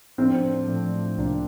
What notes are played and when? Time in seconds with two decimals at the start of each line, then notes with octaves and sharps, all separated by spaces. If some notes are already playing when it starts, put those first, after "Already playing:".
0.18 A2 F3 A3 C4 D4
0.67 A2 F3 A3 D4
1.17 C2 C3 F3 A#3 D4